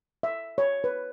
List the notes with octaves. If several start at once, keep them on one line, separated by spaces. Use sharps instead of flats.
E5
C#5
B4